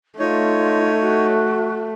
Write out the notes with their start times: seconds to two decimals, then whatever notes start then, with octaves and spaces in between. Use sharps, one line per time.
0.19 A3 D#4 F4 C#5
0.99 F#4